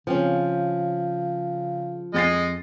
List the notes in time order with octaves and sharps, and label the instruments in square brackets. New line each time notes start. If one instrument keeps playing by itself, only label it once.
[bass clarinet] C#3 [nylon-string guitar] F3 C4 C#4
[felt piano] F2 A6 C7 [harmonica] G#3 D#5